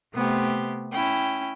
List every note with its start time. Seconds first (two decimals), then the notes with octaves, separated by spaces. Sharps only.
0.15 C3 A3 B3 C4 G4
0.92 C#4 E4 G5